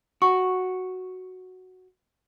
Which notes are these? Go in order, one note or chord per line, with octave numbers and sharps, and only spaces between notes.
F#4 C#6